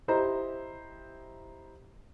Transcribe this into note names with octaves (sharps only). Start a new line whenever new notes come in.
E4 G4 C5 D#5 A#5